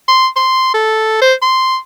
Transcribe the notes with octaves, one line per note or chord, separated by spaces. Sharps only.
C6
C6
A4
C5
C6